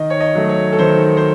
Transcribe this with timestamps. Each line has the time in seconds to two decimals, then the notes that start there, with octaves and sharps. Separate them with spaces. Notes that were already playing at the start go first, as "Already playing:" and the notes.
Already playing: D#3 D#5
0.10 C#5
0.20 D#5
0.35 F#3 A3
0.49 C#5
0.72 A4
0.79 D#3 C5
1.17 C5